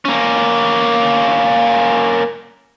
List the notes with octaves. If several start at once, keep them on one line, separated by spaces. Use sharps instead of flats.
A#3 C#4